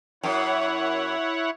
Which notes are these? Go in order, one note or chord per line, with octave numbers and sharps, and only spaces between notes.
F#2 E4 C#5 F#5